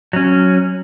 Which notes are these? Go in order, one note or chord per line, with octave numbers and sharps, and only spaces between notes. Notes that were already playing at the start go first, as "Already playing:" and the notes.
F#3 C#4